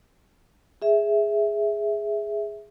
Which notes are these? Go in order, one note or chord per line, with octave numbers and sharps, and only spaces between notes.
G#4 E5